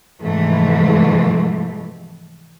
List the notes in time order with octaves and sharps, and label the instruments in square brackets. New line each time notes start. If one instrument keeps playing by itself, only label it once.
[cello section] G#2 C3 E3 F3 A3